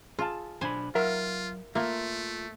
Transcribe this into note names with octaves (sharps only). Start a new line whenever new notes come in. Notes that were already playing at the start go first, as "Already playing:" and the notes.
F4 G#4 A5
B1 D4 C5 G#5 B5
F#3 F4 A#4 E5 F#5
A3 A#3 F4 E5